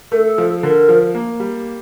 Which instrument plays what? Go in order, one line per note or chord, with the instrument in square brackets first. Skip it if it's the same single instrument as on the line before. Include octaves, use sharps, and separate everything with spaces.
[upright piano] A3 [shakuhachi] A#4
[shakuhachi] A4
[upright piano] F3
[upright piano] D3 [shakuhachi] A#4
[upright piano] F3
A#3
G3